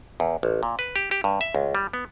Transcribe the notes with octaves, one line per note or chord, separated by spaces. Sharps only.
E2
A1
A#2
B4
G4
G4
G2
E5
C#2
G3
B3